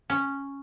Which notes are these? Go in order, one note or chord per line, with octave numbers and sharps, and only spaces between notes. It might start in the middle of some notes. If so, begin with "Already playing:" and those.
C#4